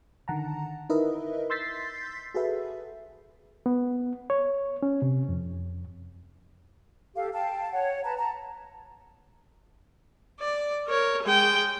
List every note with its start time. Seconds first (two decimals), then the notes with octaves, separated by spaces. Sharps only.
0.28 D3 D#3 F#5 A5 A#5
0.89 D#4 E4 A#4 B4 D#5 E5
1.50 C6 E6 G6 A6 B6 C7
2.34 F#4 G#4 A4 B4 E5
3.66 B3
4.30 C#5
4.83 C#4
5.02 C3
5.29 F2
7.16 G4 A4 F5
7.33 F5 G5 A5
7.72 C#5 F#5
8.04 B4 A5 A#5
8.18 A5 A#5
10.40 D5
10.88 A#4 C#5
11.23 G#3 G5